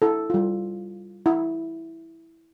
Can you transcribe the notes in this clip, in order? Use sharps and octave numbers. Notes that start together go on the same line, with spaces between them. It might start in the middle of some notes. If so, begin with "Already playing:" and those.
E4 A4
G3 F4
E4